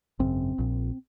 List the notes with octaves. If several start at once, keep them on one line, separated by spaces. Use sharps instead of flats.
G#1 F#2 C#3 C4
A#1 A#2